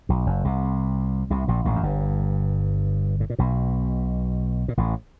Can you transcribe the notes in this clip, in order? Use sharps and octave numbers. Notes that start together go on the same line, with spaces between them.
B1 B2
F#1 F#2
C2 C3
C2 C3
A#1 A#2
A1 A2
F#2
G1 G2
A2
A#2
B1 B2
A#2
A1 A2